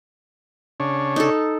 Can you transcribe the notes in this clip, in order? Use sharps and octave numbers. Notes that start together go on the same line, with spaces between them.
C#3 D4 C#5
D#4 A4